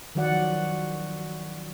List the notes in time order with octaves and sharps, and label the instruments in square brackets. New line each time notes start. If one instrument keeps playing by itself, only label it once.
[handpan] D#3 F3 F#3 F#4 D5 F#5